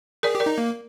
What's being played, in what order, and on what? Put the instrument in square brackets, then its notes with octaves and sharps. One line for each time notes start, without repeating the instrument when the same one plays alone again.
[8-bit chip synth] G#4 [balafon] A#4 D5
[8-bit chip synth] G4
[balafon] A#4 D5
[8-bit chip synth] D#4
A#3